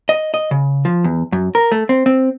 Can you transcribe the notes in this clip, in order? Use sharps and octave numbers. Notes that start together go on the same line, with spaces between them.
D#5
D#5
C#3
F3
E2
F#2
A#4
A3
C4
C4